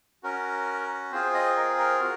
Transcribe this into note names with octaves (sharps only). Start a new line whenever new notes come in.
C#4 F#4 A#4
C4 F4 G#4 C5
D#5
A#4
A#4
F#4